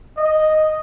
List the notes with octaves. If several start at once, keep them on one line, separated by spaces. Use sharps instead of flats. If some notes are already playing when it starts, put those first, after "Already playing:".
D#5